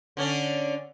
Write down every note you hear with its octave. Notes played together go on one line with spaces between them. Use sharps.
D3 C#4 D4